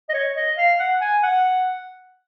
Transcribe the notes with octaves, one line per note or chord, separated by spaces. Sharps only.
D#5
C#5
D#5
F5
F#5
G#5
F#5